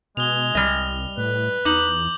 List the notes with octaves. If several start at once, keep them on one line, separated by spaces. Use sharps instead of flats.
B2 G#3 F7 G7
C2 G3 D#5
A2 B4
E2 D#4 D6 G6 F#7